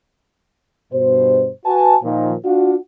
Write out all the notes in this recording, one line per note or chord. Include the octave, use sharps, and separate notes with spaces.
G2 B2 C5
F#4 B4 G#5 A5
A#2 D#3 F3
D4 F4 F#4